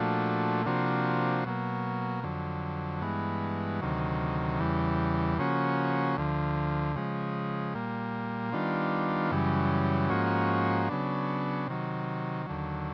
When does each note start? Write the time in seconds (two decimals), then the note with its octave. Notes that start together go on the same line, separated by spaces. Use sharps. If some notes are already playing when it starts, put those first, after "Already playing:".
Already playing: A#2 F3 A3 D4 F#4
0.66 C3 F3 A#3 D4 F#4
1.45 B2 F#3 A#3
2.24 F2 D3 F#3
3.02 G2 E3 G#3 B3
3.81 D2 C3 D#3 F#3
4.60 E2 C#3 E3 G3
5.38 C#3 F3 A#3 C#4 F#4
6.17 D2 D3 F3
6.96 C#3 F3 G#3
7.75 A#2 G3 A#3
8.52 D#3 G3 B3 D4 F4
9.31 F#2 C#3 E3 G3
10.10 G#2 F3 A#3 C#4 F#4
10.89 C#3 F#3 B3 D4
11.68 C3 D#3 F#3
12.46 D#2 D3 F#3